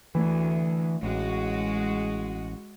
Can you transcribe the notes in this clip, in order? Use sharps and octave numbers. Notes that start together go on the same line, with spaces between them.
D2 E3
A1 G#3 F#4